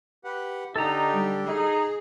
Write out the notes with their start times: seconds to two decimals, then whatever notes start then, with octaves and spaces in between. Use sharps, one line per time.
0.24 G4 B4 F#5
0.76 D3 D#4 G4 A4 A#5
1.13 G3
1.48 D#4 G#4